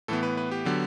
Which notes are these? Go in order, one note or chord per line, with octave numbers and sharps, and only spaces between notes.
A2 E3 B3 A4
B4
B4
G4
D3 F#3 B3